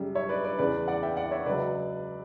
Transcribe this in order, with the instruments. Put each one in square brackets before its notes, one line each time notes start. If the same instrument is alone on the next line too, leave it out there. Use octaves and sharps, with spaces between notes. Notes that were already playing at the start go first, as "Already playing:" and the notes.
Already playing: [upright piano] F#2 C#3 G3
C#5 E5
B4 D5
B4 D5
E2 C#3 E3 B4 D5
D5 F#5
E5 G5
D5 F#5
C#5 E5
C#2 C#3 F#3 B4 D5